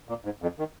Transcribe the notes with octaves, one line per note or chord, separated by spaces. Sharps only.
A#2
G#2
F2
D#3